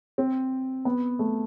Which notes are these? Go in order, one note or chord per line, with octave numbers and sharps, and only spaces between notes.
C4
B3
A3